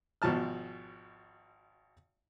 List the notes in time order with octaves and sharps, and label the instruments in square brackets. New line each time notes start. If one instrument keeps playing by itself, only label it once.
[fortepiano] G#1 B2 F3 A5 F6